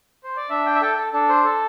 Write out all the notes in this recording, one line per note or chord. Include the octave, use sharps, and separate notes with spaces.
C5
D5
D4 E5
G5
E5
A4 G5
A4
D4 A4
C5
A4